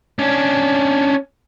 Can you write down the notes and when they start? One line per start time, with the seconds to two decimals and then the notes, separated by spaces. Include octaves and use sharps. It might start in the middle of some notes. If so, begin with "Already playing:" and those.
0.19 C#4 D4